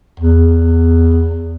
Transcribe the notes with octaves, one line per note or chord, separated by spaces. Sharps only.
E2